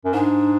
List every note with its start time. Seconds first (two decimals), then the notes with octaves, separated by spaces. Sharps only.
0.05 F#2
0.14 G#2 D4